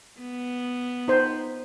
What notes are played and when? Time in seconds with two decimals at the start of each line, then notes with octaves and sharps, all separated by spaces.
0.21 B3
1.08 D#4 C5